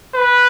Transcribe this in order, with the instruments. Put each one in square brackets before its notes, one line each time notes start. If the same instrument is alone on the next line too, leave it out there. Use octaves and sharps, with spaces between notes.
[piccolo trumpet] B4